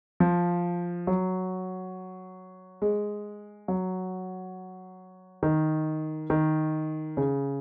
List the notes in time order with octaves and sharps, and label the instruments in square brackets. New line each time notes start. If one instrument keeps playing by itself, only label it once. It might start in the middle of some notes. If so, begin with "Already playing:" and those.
[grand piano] F3
F#3
G#3
F#3
D#3
D#3
C#3